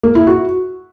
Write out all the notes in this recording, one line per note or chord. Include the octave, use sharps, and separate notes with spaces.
A#3
E4
F#4